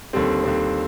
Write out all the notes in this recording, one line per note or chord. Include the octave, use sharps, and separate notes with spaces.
D#2 D3 G3 C4
D#2 D3 G3 C4